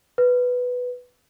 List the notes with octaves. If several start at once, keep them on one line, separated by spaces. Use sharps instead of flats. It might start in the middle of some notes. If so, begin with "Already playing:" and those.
B4